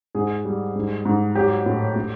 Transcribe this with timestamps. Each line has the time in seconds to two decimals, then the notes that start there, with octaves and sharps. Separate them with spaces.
0.15 G#2 G#4
0.45 G3
0.75 G#2
1.05 G#2
1.35 F#3 G4
1.66 A2
1.96 A2